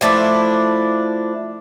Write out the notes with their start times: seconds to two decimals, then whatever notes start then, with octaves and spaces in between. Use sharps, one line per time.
0.01 F3 A3 D4 E4